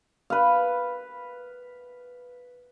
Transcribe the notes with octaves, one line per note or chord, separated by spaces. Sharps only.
B4 F5